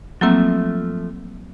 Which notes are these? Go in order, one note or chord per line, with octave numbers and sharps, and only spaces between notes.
F3 F#3 A3 A#3 C4 E5